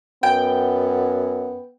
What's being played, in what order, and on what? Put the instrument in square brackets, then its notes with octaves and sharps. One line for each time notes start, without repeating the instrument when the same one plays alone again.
[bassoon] F#2 [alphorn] B3 [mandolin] G5